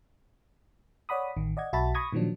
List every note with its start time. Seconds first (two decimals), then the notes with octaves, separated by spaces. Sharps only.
1.09 C#5 D5 F#5 B5 D#6
1.37 A1 D#3
1.57 D5 D#5 F#5 G#6
1.73 B1 F#4 E5 A5 B5 A6
1.94 B5 C#6 D#6 G#6 A#6
2.13 A#2 D#3 F3 F#3 D4